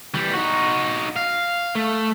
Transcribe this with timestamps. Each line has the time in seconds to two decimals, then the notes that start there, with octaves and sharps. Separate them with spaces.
0.14 E3 G3
0.33 D#4 F#4
1.16 F5
1.75 A3